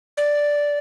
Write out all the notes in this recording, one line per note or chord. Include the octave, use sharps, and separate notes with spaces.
D5